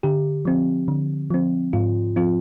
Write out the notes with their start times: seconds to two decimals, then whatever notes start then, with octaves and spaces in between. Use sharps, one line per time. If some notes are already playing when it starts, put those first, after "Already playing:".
0.03 D3 G4
0.45 F3 C4
0.88 D3
1.30 F3 C4
1.73 G#2 F4
2.16 F3 C4 F4